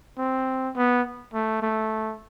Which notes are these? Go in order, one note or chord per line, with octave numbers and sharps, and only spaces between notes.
C4
B3
A3
A3